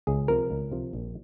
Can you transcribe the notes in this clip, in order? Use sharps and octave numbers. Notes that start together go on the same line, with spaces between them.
C#2 G#4
C3 F3 A#4
C#2
C3 F3
A#1